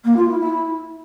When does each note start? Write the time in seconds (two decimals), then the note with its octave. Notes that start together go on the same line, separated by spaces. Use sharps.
0.04 A#3
0.16 F4
0.28 E4
0.40 E4